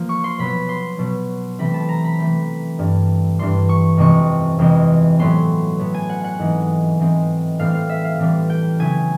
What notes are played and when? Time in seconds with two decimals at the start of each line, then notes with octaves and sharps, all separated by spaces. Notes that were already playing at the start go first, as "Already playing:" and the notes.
Already playing: F3 A#3
0.09 C#6
0.24 C6
0.38 B2 F#3 B3 B5
0.69 C6
0.99 B2 F#3 B3
1.59 C3 E3 A3 C4 B5
1.74 A5
1.89 A#5
2.04 B5
2.19 C3 E3 A3 C4
2.79 G2 E3 G3
3.39 G2 E3 G3 C6
3.69 C#6
3.97 F2 C3 E3 G#3 C4 C#6
4.59 F2 C3 E3 G#3 C4
5.19 A2 F#3 B3 C6
5.79 A2 F#3 B3
5.94 G#5
6.09 F#5
6.24 F#5
6.39 G#2 E3 G#3 C4
6.99 G#2 E3 G#3 C4
7.59 A2 E3 G3 C4 F5
7.75 F5
7.89 E5
8.05 F5
8.19 A2 E3 G3 C4
8.50 G5
8.79 C#3 F#3 B3 E4 G#5